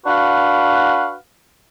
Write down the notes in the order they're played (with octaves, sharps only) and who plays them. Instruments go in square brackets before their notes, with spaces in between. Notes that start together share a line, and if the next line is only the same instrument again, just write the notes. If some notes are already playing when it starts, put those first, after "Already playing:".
[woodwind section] D4 F#4 B4 F5 F#5